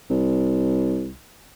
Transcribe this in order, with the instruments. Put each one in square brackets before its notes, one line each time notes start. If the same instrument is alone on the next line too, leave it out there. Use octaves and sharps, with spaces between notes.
[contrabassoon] C2